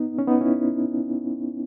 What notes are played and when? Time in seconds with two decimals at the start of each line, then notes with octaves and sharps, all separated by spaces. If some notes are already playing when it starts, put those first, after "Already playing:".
Already playing: B3 D#4
0.19 C#4
0.28 B3 D#4
0.41 C#4 E4